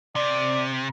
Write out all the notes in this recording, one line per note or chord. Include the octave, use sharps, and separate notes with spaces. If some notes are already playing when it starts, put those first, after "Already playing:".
C3 D5